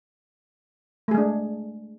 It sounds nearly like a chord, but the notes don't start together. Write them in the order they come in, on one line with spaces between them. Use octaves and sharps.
A3 G#4 G#3 D4